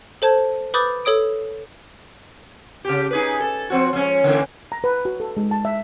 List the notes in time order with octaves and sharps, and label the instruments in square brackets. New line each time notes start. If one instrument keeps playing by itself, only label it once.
[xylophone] A4 C5 A5 G#6
B4 B5 D6 D#6 G6 A6
A4 C#5 D#6 D7
[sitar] C#3 G4
D#4 G#4 B4
A4
F3 C4 F#4
F3 G#3 C#4
D3 E3 A#3
[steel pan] A#5
B4
F#4
A4
G#3
A5
E5